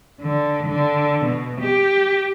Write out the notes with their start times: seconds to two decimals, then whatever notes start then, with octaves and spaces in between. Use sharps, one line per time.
0.21 D3
0.67 D3
1.25 B2
1.61 G4